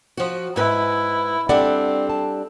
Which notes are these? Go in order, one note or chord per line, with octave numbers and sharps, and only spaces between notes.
F3 F#4
G#2 E4 B4
G3 C4 D4 A4 D5 F#5
A5